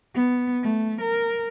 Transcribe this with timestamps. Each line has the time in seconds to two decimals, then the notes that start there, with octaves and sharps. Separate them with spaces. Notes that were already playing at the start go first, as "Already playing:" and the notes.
0.14 B3
0.63 A3
1.01 A#4